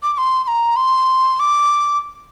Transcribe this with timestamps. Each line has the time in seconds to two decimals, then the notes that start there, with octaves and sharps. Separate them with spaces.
0.03 D6
0.13 D6
0.18 C6
0.44 C6
0.48 A#5
0.76 C6
1.39 D6